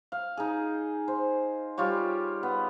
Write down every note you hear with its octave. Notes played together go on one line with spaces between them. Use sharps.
F5
D#4 G#4
C5
G3 F4 G4 C#5
B3